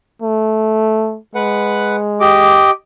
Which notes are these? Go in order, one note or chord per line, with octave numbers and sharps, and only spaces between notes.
A3
G#3 B4 F#5
G4 D#5 D6